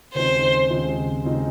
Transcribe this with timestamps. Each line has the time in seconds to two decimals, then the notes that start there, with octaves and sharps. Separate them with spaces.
0.14 D#2 C#3 G#3 C4 D#4 C5
0.70 D#2 C#3 G#3 C4 D#4
1.25 C#3 G#3 C4 D#4